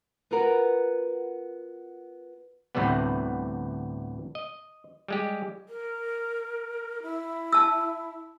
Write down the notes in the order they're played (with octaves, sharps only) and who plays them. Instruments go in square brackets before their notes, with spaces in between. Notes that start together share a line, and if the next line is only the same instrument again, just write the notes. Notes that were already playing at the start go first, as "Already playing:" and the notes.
[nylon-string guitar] B3 F4 F#4 A#4 B4
[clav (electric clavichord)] D2 A2 C3 E3 G3 B3
D#5
G3 G#3 G4
[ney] A#4
E4
[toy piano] A5 E6